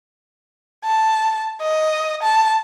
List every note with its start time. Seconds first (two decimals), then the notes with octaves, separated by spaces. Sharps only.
0.85 A5
1.62 D#5
2.23 A5